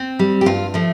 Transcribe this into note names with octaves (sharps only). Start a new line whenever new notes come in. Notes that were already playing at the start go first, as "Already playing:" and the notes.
Already playing: C4
G3
G4
G2 F4
F3 A3